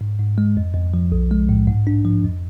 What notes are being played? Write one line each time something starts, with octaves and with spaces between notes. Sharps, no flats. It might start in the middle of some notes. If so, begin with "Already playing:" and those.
G#2
G#2
G#3
F2
F2
F3
B1
G#3
A2
G#2
D4
F3
F2